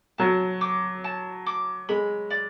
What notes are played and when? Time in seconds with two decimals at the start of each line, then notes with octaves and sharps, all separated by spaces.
0.18 F#3 A5
0.61 D6
1.04 A5
1.46 D6
1.89 G#3 B5
2.30 D5